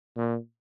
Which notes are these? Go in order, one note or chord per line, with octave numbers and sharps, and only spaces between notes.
A#2